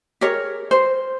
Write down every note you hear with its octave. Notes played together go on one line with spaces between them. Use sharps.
G4 G#4 A#4 C#5
C5